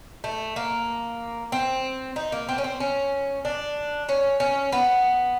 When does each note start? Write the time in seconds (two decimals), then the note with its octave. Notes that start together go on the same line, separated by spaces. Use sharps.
0.24 A3
0.56 A#3
1.52 C4
2.16 D#4
2.32 A#3
2.49 C4
2.58 C#4
2.64 C4
2.80 C#4
3.45 D4
4.09 C#4
4.40 C#4
4.72 B3